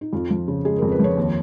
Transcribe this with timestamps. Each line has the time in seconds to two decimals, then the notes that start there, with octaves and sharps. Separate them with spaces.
0.01 D#4
0.13 F2 F4
0.30 F3
0.48 C#3
0.65 G#3 G#4
0.78 A#4
0.82 F2
0.92 B4
0.99 F3 C#5
1.17 D#2